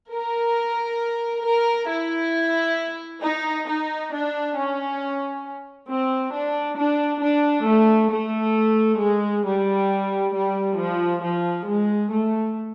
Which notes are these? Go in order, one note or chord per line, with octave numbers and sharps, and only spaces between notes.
A#4
A#4
E4
D#4
D#4
D4
C#4
C4
D4
D4
D4
A3
A3
G#3
G3
G3
F3
F3
G#3
A3